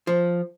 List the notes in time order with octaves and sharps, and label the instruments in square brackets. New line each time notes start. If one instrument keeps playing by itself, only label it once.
[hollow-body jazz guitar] F3